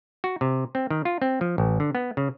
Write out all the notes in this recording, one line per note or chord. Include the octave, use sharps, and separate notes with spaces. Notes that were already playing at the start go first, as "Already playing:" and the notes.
F#4
C3
C4
D#3
F4
C4
F3
A1
D3
B3
C#3